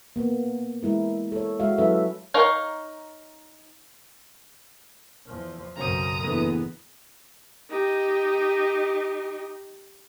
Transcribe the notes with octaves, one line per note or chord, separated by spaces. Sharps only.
A#3 B3
G#3 E4 A#4
A4 C#5
G#3 F#4 E5 F5
F#3 C#4 E4 A4 B4 E5
D#4 A#4 C#5 F5
E2 F3
B1 F#2 C#3 F#3 C4 A#5 D#6
F#1 E2 A2 D3 B3
D#4 G4